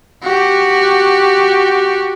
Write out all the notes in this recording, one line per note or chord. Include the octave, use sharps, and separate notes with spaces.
F#4 G4